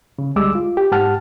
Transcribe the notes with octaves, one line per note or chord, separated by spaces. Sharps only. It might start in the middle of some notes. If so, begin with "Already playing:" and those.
C#3
D2 G3 G#3 D6 E6
F4
G4
G#2 G4 F#5 A5 F6